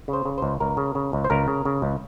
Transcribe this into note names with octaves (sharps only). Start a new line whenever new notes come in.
C#3
C5
C#3
C#2 C5
C#2 A#4
C#3
C#3
C#2
C5
C#2 A#4
C#3
C#3
C#2